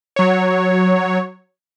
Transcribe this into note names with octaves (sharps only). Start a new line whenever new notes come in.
F#3 C#5